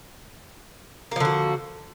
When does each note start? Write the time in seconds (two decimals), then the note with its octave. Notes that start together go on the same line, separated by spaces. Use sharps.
1.11 A#3
1.16 F3
1.20 D3
1.25 F#4